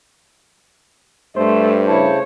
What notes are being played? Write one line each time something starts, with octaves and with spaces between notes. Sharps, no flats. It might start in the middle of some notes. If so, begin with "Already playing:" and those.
G2 A3 C5
C#3 E4 C#5 A5